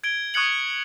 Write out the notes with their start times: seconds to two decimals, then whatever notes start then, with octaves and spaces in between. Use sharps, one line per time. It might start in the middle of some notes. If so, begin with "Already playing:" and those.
0.04 G#6 D7 G7
0.34 C#6 D#6 F#6 G#6 C#7 F#7